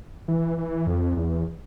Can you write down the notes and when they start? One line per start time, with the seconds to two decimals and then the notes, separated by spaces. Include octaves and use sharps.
0.28 E3
0.58 E3
0.87 F2
1.17 E2